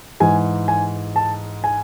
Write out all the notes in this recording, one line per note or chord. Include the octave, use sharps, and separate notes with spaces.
G#2 E3 G#5
G#5
A5
G#5